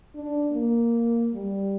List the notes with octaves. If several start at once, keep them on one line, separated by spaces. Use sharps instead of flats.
D4
A#3
G3